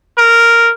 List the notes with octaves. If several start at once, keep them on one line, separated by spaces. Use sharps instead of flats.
A#4